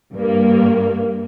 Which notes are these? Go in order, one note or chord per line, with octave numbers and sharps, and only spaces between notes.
G2 A#3